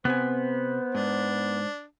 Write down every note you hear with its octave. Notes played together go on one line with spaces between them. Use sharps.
C3 B3 C4 C5 G#5
G#2 D4